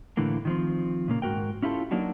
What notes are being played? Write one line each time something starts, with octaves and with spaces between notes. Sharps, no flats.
A2 D3 E3 A#3
D#3 F3 C4
A#2 C#3 A#3
G#2 F#4 A#4 G5
C#4 E4 F4 G4 A4
F#3 A#3 D4 D#4 F#4